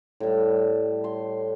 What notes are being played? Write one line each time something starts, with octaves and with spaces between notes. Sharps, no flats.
A2 G3
C6